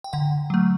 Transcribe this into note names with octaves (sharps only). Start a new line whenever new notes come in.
G5
D3 F#5
F#3 A3